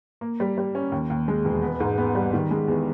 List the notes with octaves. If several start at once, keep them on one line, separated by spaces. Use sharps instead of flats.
A#3
G3
G3
C#4
D#2
D#2
G#3
E1
B3
G#2
B3
G3
D#3
G#3
E2